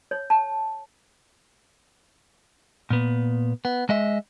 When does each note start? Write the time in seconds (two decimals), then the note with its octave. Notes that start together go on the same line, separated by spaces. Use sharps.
0.11 C#5
0.30 A5
2.91 A#2 B3
3.65 B3
3.89 G#3 D#5 E5